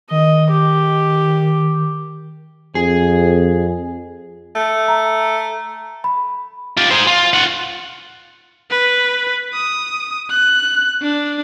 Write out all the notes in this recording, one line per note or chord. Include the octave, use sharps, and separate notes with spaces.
D#3 D#5
G4
F2 G#4
A3
A#5
B5
F4 G4
G#4 C5
F4
F4 F#5
B4
D#6
F#6
D4